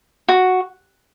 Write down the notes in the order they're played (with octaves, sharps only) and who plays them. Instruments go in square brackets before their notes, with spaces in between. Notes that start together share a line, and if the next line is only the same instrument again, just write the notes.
[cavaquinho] F#4